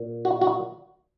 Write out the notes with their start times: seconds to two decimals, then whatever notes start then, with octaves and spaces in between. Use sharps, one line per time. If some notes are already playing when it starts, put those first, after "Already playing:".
Already playing: A#2
0.25 F#4
0.41 F#4